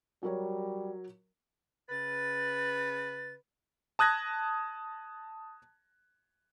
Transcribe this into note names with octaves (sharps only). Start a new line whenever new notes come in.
F#3 G3 A#4 C#5
C#3 B4 A6
A5 D#6 F#6 G#6 A#6